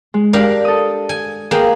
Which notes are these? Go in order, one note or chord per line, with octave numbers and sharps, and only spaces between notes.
G#3
D4 G4 A#4 F5
A4 D#6
G#5
A#3 B3 G#4 A#4 G5